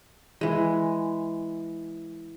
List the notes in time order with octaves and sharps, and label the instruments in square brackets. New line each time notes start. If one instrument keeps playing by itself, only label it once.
[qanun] E3 G#3